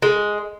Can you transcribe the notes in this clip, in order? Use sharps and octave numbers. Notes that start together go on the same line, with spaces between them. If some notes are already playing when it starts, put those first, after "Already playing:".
G#3